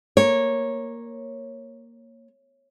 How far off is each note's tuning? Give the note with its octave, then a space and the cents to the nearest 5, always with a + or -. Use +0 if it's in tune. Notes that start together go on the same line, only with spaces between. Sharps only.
A#3 +0 C#5 -15